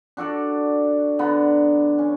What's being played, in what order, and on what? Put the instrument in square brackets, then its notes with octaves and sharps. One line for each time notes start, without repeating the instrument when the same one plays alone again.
[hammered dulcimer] D4 F#4 A4 D5
D3 B3 F#5 A#5
C#4